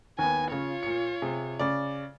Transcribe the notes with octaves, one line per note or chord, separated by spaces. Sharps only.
D#2 B3 G#5
C#3 F4 C#5
A#2 C#7
C3 G#4
C#3 D5